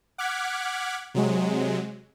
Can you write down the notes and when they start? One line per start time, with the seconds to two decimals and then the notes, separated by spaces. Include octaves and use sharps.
0.18 F#5 D6 F6 F#6 G#6 B6
1.14 C3 F#3 G#3